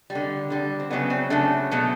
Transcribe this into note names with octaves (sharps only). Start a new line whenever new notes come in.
G3
D3
D3 G3
C4
C#3 F#3 A3 B3
C4
C#3 F#3 A3 D4
B2 F#3 A3